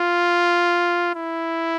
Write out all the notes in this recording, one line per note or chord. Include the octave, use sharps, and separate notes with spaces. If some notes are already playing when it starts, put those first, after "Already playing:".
Already playing: F4
E4